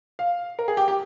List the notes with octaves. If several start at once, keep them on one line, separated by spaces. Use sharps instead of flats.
F5
A#4
G#4
G4
G4